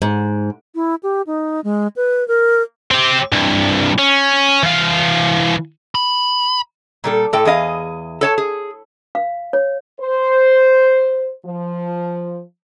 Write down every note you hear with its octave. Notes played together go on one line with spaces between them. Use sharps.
G#2
E4
G4
D#4
G#3
B4
A#4
C4 G4
C2 G2
C#4
E3 F5
B5
A#2 G3 A4
A2 A4 G5
E2 G#4 D#5 F5
A4 C#5 A5
G#4
F5
C#5
C5
F3